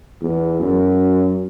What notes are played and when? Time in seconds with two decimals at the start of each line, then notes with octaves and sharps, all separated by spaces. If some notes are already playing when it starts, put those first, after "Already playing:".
0.21 E2
0.60 F#2